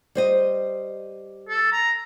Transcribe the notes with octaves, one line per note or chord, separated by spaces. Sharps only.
G3 C5 D#5
A4
A#5